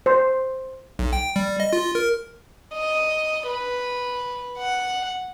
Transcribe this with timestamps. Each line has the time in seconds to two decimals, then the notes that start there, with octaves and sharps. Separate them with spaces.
0.06 C5
0.99 B1
1.13 G5
1.36 G3
1.60 D#5
1.73 F4
1.95 A#4
2.74 D#5
3.47 B4
4.58 F#5